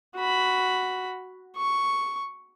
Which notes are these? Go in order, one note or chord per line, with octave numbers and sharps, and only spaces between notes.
F#4 B5
C#6